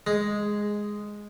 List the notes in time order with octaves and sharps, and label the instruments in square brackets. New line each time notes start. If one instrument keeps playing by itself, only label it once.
[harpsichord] G#3